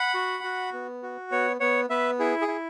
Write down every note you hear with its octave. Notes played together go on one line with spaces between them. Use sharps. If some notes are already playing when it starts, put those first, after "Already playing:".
Already playing: F#5 B5
F#4
F#4
B3
F#4
B3 C#5 F#5
B3 C#5 F#5
B3 B4 E5
E4 G#4
G#4
E4